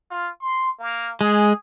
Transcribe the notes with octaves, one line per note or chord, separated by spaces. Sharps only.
F4
C6
A#3
G#3 G#4